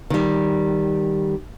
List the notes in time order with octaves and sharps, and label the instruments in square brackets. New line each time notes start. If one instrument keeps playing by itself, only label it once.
[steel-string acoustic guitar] D#3 G3